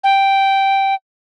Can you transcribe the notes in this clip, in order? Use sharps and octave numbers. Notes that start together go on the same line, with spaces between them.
G5